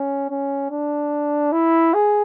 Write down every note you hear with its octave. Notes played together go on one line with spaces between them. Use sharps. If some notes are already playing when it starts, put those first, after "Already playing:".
Already playing: C#4
C#4
D4
E4
G#4